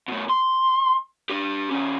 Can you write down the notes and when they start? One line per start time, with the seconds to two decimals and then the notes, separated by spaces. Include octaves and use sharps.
0.08 B2 A3
0.29 C6
1.30 D4 G4
1.71 D#3 C#4